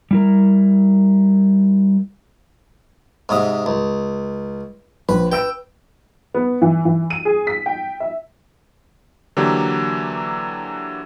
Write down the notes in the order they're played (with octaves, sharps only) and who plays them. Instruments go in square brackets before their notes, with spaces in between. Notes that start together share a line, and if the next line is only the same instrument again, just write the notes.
[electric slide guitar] G3 E4 A#4
[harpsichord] G#2 C3 D#6
C#2
[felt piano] A#1 [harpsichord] B4
[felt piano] B4 E6 D7 [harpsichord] G5
[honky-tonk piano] B3
E3
E3
D#7
G#4
B6
G5
E5
[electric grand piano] D3 E3 F#3 A#3 G4